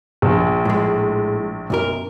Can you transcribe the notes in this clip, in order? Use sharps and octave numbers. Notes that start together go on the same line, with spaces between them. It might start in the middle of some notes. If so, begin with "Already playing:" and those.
A#1
A2 G#3
B1 F#2 A#4